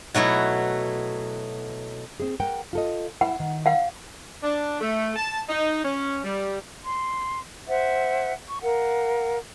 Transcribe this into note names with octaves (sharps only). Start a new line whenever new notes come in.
B2 F#3 A3 E4
C4 G#4
A#4 F#5 G5
F4 A4 D#5
E4 F#5
D#3
F5 F#5
D4
A3
A5
D#4
C#4
G3
C6
C5 E5 F#5
C#6
A#4 F5 F#5